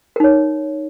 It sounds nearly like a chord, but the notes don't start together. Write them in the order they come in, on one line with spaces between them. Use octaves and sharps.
A#4 D#4 C#5